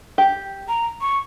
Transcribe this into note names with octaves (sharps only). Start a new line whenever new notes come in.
G4
A#5
C#6